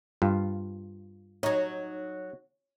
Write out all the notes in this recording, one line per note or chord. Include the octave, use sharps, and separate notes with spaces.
G2 F4
F#3 D#4 C#5